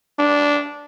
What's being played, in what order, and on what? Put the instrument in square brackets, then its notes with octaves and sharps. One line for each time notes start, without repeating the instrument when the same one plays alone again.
[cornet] D4